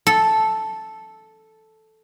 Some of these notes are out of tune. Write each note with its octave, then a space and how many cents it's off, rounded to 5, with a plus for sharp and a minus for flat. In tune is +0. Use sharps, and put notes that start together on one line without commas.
A4 -5